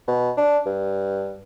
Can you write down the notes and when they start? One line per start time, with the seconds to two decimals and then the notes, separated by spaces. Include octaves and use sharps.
0.08 B2
0.37 D4
0.66 G2